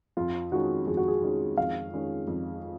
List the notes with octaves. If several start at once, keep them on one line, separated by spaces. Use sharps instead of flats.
F2 F4
D#3 G#3 C#4 F#4
F2 G#4
F#4
G#4
D#3 G#3 C#4
F2 F5
D#3 G#3 C#4
F2